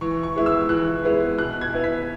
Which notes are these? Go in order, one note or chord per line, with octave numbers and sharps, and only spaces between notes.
E3 C#6
C#6
G#3 B3 E4
E6
E3 F#6
G#3 B3 E4
B2 F#6
G#6
B3 E4
B6